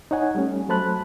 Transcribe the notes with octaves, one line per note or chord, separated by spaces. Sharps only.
D#4 C#5 F#5 G#5
G3 A3 C#4
F#3 A3 C5 A5 B5 F#6